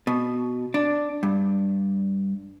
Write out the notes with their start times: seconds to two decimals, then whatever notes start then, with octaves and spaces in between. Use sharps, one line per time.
0.07 B2
0.74 D4
1.23 G2